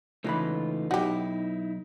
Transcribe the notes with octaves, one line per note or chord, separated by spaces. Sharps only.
C#2 E3 A3 D#4 F4 B5
B1 D#4 E4 F#4 G4